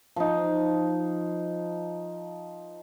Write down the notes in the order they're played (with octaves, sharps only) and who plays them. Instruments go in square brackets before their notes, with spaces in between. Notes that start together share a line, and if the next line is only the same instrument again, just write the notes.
[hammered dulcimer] F3 D#4